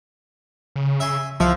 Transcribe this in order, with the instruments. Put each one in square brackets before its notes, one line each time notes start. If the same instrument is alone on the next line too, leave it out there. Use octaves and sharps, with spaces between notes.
[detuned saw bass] C#3
[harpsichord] E5 G#5 C6
[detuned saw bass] C2 [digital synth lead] F3 [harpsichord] E5 F5